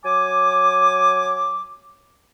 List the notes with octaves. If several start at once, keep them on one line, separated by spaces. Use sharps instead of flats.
F#3 G#5 D6